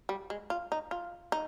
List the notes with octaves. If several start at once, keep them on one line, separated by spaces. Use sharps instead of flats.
G3
G#3
F4
D#4
F4
D#4